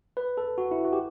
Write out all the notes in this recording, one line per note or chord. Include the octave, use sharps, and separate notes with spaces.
B4
A4
F#4
E4
F#4
G4